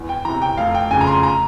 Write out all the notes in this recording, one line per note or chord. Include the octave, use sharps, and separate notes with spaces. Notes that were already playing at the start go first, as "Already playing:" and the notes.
Already playing: E2
G5
E3 A#5
C3
G5
F1 F5
G5
F2 C#3 G#5
A#5
C6
A#5